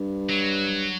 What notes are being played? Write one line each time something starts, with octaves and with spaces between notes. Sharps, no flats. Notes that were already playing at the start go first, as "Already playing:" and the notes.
Already playing: G2
F#3